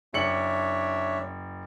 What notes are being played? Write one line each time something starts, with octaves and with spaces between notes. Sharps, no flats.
F#1 D4 C#5 E5 C#7 F#7